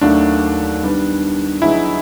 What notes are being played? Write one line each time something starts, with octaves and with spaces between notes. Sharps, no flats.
D#2 D#3 F#3 A3 D4
D#3 G3 B3 D4
D3 F#3 B3 D#4 E4 G#4